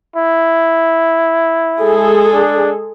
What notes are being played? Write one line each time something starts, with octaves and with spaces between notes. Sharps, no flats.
E4
G#3 G#4 A4
D4